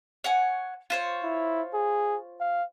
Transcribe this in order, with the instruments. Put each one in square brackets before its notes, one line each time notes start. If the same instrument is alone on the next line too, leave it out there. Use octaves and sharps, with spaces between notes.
[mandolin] C#5 F#5 G#5
F4 C5 C#5
[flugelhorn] E4
G#4
F5